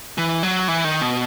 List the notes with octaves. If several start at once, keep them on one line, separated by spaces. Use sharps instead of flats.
E3
F#3
E3
D#3
B2